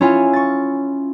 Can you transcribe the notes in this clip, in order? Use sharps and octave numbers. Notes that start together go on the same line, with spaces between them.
C#4 E4 F4 C#5 G#5
C#6 A6